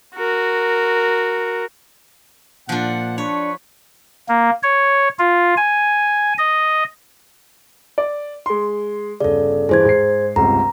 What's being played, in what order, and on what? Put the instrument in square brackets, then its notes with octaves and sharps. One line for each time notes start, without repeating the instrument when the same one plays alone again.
[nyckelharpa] F#4 A#4
[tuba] A#2 [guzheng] F3 D4 [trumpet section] F#5
[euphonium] D4 [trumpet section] B4 C#6 [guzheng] C#5
[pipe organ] A#3
C#5
F4
G#5
D#5
[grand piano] D5
G#3 C6
[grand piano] G1 C#3 [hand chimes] A4 D5
[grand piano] G2 E3 [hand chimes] G#4 C5 G#6
[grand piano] G#2 C7
[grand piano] G1 C#2 C3 [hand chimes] A#5